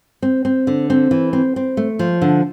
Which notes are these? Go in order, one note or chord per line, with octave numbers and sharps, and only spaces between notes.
C4
C4
D3
C4
E3
C4
C4
A3
F3
D3